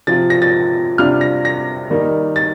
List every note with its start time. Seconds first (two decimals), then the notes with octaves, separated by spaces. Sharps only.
0.07 C3 F3 C4 F4 A6
0.30 A#6
0.42 A6
0.98 C3 G3 D4 F4 F6
1.21 A#6
1.45 A#6
1.90 D#3 G3 A#3 D#4
2.36 A6